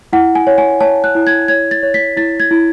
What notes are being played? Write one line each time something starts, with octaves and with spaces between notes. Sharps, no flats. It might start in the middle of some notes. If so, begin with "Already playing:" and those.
E4 F#5
G#5
C#5
G#5
C#5 A5
F#6
E4
G#6
C#5 G#6
A6
C#5
B6
E4 A6
G#6
E4